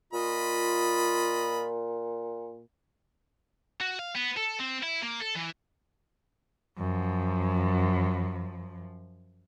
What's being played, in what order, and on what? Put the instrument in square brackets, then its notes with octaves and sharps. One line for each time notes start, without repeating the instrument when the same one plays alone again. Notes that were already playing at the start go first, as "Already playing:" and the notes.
[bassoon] A#2 [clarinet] F4 [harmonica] D#5 B5
[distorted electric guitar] F#4
F5
B3
A4
C4
E4
A#3
A4
E3
[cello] F#2 F3